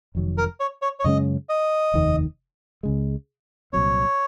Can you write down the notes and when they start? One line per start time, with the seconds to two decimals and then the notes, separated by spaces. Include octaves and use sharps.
0.15 F1 F2 D#3 F#3
0.38 A#4
0.60 C#5
0.82 C#5
1.00 C#5
1.04 F#2 C#3 G#3 C#4 D#5
1.49 D#5
1.94 F1 D#2 D#3
2.83 C#2 C#3 G#3
3.73 C2 A#2 F#3 C4 C#5